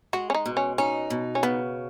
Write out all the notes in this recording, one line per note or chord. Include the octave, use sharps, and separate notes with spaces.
G#3 F#4
C#4
D#4
B2
C#4
C#4 D#4
B2
C#4
C#3 B3